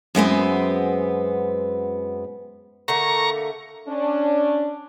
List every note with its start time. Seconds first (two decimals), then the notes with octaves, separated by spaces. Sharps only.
0.15 F#2 G#3 B3 C4
2.88 D3 A3 A#3 A#5 C#6
3.88 C#4 D4